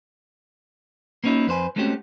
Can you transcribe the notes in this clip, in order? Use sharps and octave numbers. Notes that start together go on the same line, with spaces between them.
A#3 B3 C#4 D#4 E4 F#4
F2 B4 C5 G#5
G#3 A3 C4 C#4 F#4 G4